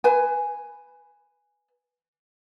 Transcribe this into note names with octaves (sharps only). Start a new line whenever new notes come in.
B4 G#5